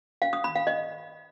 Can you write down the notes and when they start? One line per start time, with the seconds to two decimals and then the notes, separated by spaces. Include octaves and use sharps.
0.22 F5
0.33 D#6
0.44 B5
0.55 F5
0.67 D#5